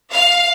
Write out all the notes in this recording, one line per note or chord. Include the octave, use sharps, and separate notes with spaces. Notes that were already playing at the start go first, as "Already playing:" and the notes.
F5